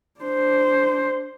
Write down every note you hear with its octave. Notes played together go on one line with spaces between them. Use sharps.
D4 C5